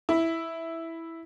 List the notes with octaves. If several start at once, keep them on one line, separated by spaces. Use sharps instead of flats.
E4